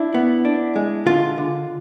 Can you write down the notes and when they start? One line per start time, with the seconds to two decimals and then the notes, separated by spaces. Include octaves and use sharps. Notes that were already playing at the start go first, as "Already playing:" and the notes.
Already playing: D4 E4
0.14 B3
0.45 D4
0.76 G#3
1.06 D3 F4
1.38 D3